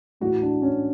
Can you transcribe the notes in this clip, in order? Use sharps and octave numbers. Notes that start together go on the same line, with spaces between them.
A2 E3 F#4
D4
C#4